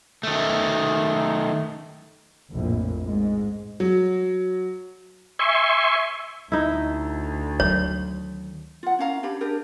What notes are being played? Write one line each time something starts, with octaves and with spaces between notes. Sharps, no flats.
D#3 A3
A#1 F2 A2
G#2 G#3
F#3
E5 G#5 C6 C#6
D2 D#4 E4
D#3 F#3 C#5
F4 F#5
C#4 E4 F5 A#5
D4 G4 C#5 B5
D4 G4 G#4 A#4